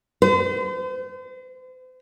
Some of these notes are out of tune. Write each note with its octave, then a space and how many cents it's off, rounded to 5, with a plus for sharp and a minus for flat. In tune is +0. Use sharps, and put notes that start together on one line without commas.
C5 -40